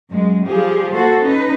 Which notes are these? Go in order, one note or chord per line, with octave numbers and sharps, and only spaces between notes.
F#2 G#3
F3 G3 G4 G#4
A#3 F#4 A4 C5
C#4 D#4 B4